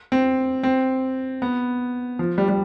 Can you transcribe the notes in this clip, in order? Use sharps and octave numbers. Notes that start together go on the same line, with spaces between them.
C4
C4
B3
F3
G3
G3